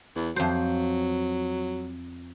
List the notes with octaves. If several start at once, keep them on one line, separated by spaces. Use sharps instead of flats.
E2
F2 F#3 C5